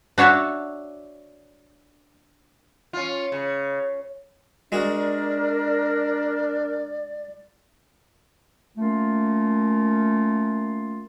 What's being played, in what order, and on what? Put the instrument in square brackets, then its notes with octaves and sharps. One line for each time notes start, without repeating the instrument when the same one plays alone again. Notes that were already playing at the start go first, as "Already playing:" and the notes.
[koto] D4 F#4 C#5 E5 A5
[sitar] C#4 F4
C#3
[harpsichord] G#3 F#4 G#4 [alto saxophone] D4 [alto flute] A#4 [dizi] D5
[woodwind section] A3 A#3 C#4 F4 A#4